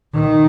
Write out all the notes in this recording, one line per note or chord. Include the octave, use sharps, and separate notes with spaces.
D#3